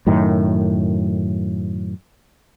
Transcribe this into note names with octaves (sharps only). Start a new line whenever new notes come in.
F#2 A2 D#3